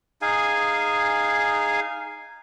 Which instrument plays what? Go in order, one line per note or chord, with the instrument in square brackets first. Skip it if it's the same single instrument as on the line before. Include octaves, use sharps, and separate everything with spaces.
[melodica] D#4 G#4 F5 G#5